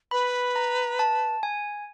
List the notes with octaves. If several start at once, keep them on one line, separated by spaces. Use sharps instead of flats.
B4 B5
A#5
A5
G#5